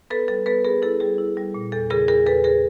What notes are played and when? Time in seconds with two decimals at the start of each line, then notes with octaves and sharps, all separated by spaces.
0.10 B3 A4 B4
0.28 G3 A4
0.46 B3 A4 B4
0.64 B3 G#4 A#4
0.82 E4 A4
1.00 G3 G#4
1.18 E4
1.37 G3
1.54 A#2
1.72 E2 A4
1.90 C#3 G#4 A#4
2.08 E2 G#4 A#4
2.26 E2 A4 B4
2.44 G#4 A#4